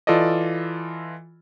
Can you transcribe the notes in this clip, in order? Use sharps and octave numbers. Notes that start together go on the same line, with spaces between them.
E3 F4 A4 D5 D#5